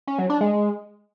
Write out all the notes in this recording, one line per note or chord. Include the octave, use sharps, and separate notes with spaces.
C#4
F#3
D4
G#3